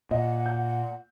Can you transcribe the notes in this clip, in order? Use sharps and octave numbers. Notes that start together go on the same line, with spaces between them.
A#2 D#5 F#5
G6